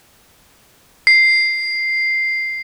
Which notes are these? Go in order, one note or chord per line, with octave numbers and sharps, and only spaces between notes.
C7